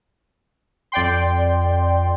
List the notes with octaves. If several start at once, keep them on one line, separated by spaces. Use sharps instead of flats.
F2 D5 G5 C6